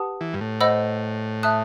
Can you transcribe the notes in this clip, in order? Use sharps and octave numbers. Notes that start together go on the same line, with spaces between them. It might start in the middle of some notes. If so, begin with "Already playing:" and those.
Already playing: G4 B4 F#5 A5 D#6
E3
G2
A2
C5 D#5 F#5 B5 E6
E5 A5 D#6 F#6